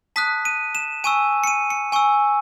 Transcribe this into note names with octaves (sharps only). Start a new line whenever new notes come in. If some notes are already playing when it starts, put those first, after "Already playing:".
A5 D#6 F#6 B6
D#7
E7
G#5 C#6 E6 D#7
C#7
D#7
C#7
G#5 C#6 E6